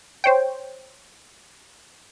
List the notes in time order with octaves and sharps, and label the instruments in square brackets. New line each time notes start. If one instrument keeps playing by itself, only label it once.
[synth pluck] C5 C#5 G5